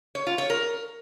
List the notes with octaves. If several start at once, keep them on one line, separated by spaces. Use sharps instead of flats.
C#5
F4
C#5
A#4